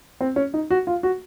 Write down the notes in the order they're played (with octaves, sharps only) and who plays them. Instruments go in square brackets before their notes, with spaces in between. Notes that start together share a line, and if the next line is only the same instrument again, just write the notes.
[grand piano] C4
C#4
D#4
F#4
F4
F#4